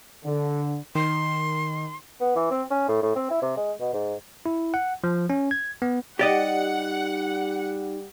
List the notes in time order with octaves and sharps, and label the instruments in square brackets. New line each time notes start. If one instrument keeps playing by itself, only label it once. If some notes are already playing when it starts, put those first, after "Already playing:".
[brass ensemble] D3
[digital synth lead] D#3 [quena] C6
[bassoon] B3
E3
C4
C#4
A2
A2
C4
E4
C3
G#3
B2
G#2
[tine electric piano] E4
F#5
F3
C#4
G#6
B3
[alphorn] G3 [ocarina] D#4 [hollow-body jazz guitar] G4 D5 D#5 [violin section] F#5